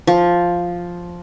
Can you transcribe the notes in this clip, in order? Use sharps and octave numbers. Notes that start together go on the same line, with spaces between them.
F3